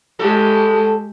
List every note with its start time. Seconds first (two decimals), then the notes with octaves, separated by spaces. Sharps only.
0.19 A2 G#3 G4 A4